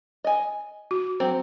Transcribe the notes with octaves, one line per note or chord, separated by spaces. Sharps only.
D#5 G#5
F#4
F#3 C4 C5